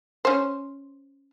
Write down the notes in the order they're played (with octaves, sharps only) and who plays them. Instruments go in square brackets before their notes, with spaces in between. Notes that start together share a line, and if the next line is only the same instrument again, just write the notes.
[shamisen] C#4 C5